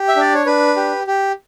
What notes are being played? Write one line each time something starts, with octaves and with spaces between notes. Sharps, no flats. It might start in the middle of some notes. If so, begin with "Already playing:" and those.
Already playing: G4
E5
D4 D5
C#5
D4 B4
G4
G4